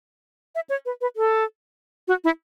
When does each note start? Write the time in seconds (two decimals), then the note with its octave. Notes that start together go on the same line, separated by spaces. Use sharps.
0.55 E5
0.70 C#5
0.86 B4
1.01 B4
1.16 A4
2.08 F#4
2.24 E4